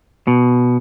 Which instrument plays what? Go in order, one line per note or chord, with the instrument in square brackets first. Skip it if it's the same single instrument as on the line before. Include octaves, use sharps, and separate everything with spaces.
[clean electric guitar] B2